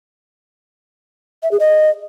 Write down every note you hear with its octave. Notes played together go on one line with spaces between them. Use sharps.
E5
G#4
D#5